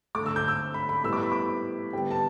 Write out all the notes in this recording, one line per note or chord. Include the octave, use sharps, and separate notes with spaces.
D3 A3 D6
E6
G6
E6
B5
B5
A2 G3 B3 E6
D6
B5
D6
D3 G3 B3 G5
A5